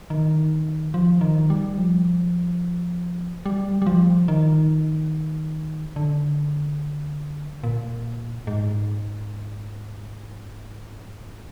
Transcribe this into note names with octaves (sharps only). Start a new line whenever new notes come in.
D#3
F3
D#3
G3
F3
G3
G3
F3
D#3
D3
A#2
G#2